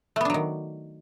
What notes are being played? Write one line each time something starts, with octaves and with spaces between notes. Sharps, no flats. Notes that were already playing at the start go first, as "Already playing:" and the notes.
D#3 F#3 A3 B3 D4